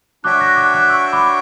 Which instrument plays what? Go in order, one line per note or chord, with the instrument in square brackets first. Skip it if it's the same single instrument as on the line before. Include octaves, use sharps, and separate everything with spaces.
[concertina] D4 F#4 C#5 E5 G5 [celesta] D6 F#6
[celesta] F#6 A#6
D6 F#6
D6 F#6
C#6 E6
B5 D6